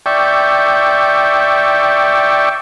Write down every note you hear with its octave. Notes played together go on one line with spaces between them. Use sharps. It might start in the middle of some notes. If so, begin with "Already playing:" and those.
D5 E5 G5 C#6